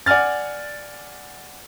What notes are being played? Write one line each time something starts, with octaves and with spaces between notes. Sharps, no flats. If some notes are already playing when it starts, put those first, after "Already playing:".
D5 F#5 G#5 F6 A6